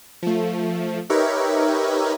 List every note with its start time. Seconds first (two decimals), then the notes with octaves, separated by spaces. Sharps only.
0.22 F3 A3
1.10 D#4 G4 A#4 B4 C#5 E5